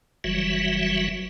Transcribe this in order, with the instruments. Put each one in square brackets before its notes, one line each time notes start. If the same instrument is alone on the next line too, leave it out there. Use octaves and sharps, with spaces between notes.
[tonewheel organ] F#1 E3 F#3 G3 F#4 E5